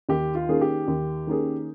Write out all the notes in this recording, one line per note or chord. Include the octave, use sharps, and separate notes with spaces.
D#2 G4
F4
D#3 A#3 C#4 G#4
G4
D#2
D#3 A#3 C#4 G#4